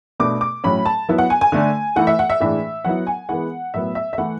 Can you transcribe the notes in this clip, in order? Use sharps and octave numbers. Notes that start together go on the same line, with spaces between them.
B2 A3 D4 D6
D6
A2 F#3 C#4 B5
A5
F#3 B3 E4
F#5
G#5
G#5
D3 A3 D4
E3 A3 E4 F#5
E5
F#5
E5
A2 E3 G#3 D4 E5
F#3 B3 E4 F#5
G#5
E3 G#3 B3 F#5
A2 F#3 B3 E5
E5
E5
E3 A3 E4 F#5